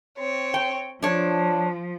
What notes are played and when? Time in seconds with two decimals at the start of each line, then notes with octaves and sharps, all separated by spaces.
0.18 C4 C#5
0.54 G5
1.02 F3 D4 C#5